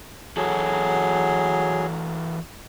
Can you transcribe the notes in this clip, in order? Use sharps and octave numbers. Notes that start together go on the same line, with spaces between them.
E3 F#3 F#4 G#4 A4